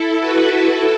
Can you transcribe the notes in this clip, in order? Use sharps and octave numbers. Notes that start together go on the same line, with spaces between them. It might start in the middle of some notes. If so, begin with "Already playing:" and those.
Already playing: E4 A4
F#4 B4
E4 A4